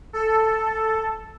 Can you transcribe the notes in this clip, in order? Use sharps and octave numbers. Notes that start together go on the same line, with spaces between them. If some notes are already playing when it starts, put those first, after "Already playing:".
A4